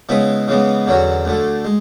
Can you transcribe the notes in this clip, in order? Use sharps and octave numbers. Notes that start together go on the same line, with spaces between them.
C#3 G#3 B3 E4 B4
C#3 E3 G#3 B3
E2 D3 F#3 C#4 F#4
D2 D3 A3
G#3